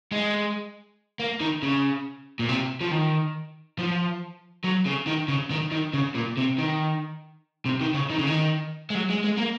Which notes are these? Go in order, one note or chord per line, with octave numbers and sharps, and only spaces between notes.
G#3
A#3
D#3
C#3
A#2
C3
F3
D#3
F3
F#3
C#3
D#3
C#3
D#3
D#3
C#3
A#2
C3
D#3
C3
D#3
C#3
D#3
C#3
D#3
G#3
F#3
G#3
G#3
A#3